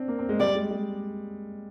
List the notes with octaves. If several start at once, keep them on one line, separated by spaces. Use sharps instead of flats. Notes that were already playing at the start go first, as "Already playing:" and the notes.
Already playing: C4 D4
A#3
C4
G#3
G3 D5
G#3
G#3